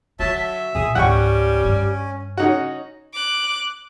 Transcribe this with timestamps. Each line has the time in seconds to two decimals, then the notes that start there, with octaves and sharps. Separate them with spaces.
0.19 D3 F#3 E5 A5
0.35 E5
0.75 A#2 C4 G#4
0.95 C#2 G#2 G3 C#4 F#5 G5 C#6
1.64 G2
2.37 C#4 D#4 F#4
3.14 D6 F#6